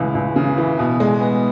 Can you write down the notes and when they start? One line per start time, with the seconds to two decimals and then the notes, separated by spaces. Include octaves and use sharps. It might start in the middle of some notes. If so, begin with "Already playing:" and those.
Already playing: C#2 C#3 E3
0.15 C#2
0.36 C#3
0.58 E3
0.79 B2
1.00 G#3
1.21 B3